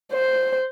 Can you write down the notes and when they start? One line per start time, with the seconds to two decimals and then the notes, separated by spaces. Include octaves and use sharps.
0.13 C5